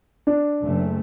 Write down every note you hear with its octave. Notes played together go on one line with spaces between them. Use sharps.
D4
F#1 A3